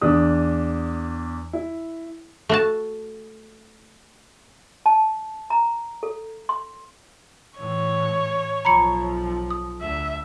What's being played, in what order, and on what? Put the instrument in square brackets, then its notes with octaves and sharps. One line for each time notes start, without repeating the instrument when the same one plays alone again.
[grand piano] E2 D4 D#6
E4
[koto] A3 F#4 A5
[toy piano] A5
A#5
A4
C6
[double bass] A2 E3 [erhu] C#5
[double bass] B1 F3 [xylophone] A#5 B5 C#7
[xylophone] D#6
[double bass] D2 [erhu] E5